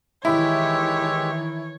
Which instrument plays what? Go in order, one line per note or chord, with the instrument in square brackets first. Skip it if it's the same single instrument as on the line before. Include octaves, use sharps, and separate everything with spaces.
[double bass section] D#3 E3 [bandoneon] G#3 G4 E5 [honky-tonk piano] E4 [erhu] C#5